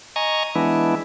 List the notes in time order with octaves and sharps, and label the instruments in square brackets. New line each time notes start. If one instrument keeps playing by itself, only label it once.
[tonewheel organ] D#5 G#5 A#5 C#6
E3 G#3 B3 D4 E4